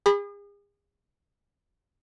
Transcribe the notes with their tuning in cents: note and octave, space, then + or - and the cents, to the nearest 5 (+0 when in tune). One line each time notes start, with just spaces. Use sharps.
G#4 -40 B5 +0